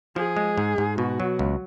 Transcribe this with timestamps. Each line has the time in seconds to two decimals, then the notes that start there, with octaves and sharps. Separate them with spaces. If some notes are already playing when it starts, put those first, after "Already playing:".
0.16 F3 G#4
0.37 G#3
0.58 G#2
0.78 G#2
0.98 B2 F#4
1.20 F#3
1.39 C#2